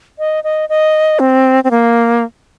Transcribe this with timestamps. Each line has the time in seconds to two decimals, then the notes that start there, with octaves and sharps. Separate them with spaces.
0.19 D#5
0.44 D#5
0.69 D#5
1.19 C4
1.64 C4
1.71 A#3